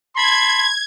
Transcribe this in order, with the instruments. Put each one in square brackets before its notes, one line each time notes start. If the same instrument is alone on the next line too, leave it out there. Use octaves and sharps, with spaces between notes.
[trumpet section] A5 B5 C6 [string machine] G#6